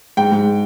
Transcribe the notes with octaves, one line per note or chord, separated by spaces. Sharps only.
G#2 G5
G#2